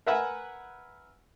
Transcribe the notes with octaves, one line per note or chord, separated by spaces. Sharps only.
A#4 B4 E5 F#5 G#5